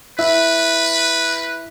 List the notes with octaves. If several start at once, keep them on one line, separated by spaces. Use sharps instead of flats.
E4 B4 E5